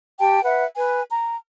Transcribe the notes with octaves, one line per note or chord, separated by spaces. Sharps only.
G4 G5 A5
B4 E5 F#5
B4 G#5
A#5